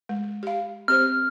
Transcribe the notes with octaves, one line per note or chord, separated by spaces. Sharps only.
G#3
G4 F5
C4 G4 C5 F6